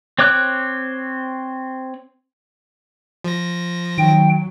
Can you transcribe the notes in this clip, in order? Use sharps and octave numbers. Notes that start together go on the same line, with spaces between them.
C4 C#5 D6 F#6
F3 A#6
D#3 F#3 G5